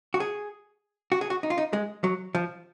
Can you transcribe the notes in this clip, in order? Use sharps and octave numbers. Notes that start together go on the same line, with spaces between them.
F#4
G#4
F#4
G#4
F#4
D#4
F4
D#4
G#3
F#3
F3